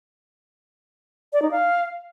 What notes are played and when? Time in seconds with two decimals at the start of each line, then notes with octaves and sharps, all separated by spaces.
1.33 D5
1.42 D#4
1.51 F5